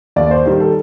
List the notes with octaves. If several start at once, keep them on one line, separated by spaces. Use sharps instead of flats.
D#2 D5
C5
D#3 G3
A4